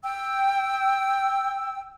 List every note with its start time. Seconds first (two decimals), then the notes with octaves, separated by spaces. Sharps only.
0.03 G5 E6